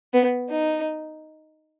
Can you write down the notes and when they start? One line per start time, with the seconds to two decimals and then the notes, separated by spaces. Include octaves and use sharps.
0.14 B3
0.49 D#4